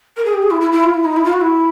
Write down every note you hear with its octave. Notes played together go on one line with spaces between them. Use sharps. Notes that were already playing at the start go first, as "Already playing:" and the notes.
A#4
G#4
G4
G#4
E4
E4
E4
F4
E4
D#4
E4
F4
F#4
E4